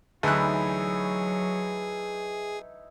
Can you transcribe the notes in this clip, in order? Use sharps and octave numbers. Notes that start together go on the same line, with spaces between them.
D2 E3 F#3 D#4 E4 G#4 F#6